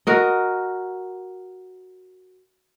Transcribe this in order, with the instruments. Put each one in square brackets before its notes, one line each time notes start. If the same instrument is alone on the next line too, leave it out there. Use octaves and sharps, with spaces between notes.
[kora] F#4 A#4 D#5